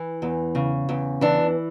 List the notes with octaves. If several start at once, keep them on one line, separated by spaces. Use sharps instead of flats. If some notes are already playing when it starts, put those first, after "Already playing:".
Already playing: E3
E2
C#3
E2
E3 D4